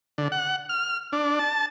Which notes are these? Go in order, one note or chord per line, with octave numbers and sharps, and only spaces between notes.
D3
F#5
F6
D4
A5